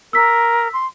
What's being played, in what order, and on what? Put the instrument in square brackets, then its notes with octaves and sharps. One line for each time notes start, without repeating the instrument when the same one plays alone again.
[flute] A#4 [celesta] E6 B6
[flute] C6